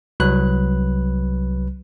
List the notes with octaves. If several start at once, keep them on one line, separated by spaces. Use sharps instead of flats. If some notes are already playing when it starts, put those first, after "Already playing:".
C2 F#3 B4 F#6